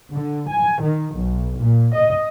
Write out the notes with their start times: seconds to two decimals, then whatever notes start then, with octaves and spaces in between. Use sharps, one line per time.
0.14 D3
0.50 G#5
0.83 D#3
1.17 B1
1.59 A#2
1.95 D#5